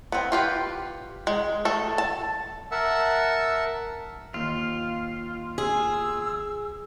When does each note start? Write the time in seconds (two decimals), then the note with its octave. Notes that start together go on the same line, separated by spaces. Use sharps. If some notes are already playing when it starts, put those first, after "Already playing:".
0.12 B3 C4
0.32 F4 G4 B4
1.27 G#3
1.65 A3 A4
1.98 A5
2.71 A#4 E5 F#5 A5 E6
4.34 D#2 F4
5.58 G#4 E6